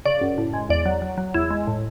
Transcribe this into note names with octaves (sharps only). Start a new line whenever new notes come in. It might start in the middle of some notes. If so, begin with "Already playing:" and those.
C#3 D5
F#2
A2
G#3
E2 D5
F#3
F#3
F#3
E2 E4
G#3
A2